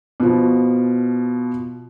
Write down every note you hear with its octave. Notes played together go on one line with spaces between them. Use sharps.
B2 F3